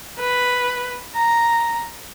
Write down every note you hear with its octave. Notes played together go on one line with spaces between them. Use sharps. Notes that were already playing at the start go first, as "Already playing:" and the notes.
B4
A#5